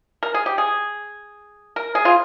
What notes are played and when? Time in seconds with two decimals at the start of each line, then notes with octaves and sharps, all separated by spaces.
0.23 A#4
0.34 G#4
0.46 G4
0.58 G#4
1.76 A#4
1.95 G#4
2.05 F4